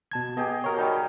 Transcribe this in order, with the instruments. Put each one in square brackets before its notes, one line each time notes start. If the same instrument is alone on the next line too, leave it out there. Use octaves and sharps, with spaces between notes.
[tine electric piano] B2 A5 G#6
[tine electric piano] B3 [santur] G4 G#4 D#5
[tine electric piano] F#4 A#4 C#5
[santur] G3 D#4 G#4